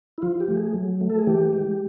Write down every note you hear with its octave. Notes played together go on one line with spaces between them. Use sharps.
E4
F3 F4
G4
A3
G#4
F#3
A3
A4
G#4
E3 G4
G#3